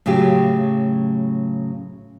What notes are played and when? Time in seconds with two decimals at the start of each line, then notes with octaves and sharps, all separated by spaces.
0.06 A2 C#3 F#3 F4 G4